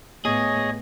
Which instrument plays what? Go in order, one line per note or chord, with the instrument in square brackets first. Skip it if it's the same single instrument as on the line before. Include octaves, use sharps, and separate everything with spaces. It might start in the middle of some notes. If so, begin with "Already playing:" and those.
[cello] A2 B3 [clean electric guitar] G#4 [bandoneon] C#5 D#5